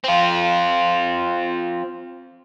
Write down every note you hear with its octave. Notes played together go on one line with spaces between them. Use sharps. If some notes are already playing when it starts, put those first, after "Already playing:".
C4 F4